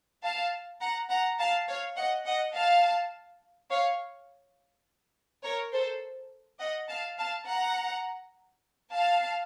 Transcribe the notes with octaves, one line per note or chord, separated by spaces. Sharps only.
F5 A5
F#5 A#5
F#5 A#5
F5 A5
C#5 F5
D#5 F#5
D#5 F#5
F5 A5
C#5 F5
A#4 C#5
A4 C5
D#5 F#5
F5 A5
F5 A5
F#5 A#5
F5 A5